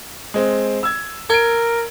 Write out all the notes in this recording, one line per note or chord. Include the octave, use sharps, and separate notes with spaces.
G#3 C4
E6 G#6
A#4 G#6 D7